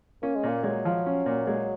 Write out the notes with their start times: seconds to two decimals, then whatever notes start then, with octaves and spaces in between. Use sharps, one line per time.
0.22 A#3 C#4
0.36 G#3
0.43 A#2 A#3
0.64 F#3 G#3
0.85 F3
1.06 C#4
1.26 A#2
1.47 G#3